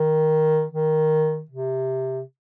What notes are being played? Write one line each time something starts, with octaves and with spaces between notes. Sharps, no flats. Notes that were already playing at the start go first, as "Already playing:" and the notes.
Already playing: D#3
D#3
C3